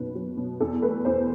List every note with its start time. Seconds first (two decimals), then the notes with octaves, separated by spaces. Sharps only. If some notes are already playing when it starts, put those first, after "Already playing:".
Already playing: F#1 B2 D#3 F#3 B4
0.15 F#3
0.37 B2
0.60 E2 A4
0.82 A3 B4
1.05 E2 C5